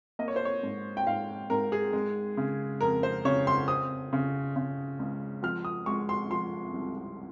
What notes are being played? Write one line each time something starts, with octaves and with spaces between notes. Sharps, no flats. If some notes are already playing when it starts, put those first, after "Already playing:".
A#3 D#5
C#5
C5
C#5
G#2
G5
G#2 F5
G#2 A#4
G#4
G#3
C#3
F2 A#4
C5
C#3 C#5
C6
C4 D#6
C#3
C#3
C#2
F3 F6
D#6
G#3 C#6
C6
F3 C6
C2